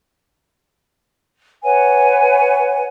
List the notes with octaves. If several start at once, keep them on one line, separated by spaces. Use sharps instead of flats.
B4 C#5 F#5 G#5